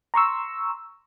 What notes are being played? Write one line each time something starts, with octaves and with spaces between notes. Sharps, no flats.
A#5 C6 C#6 E6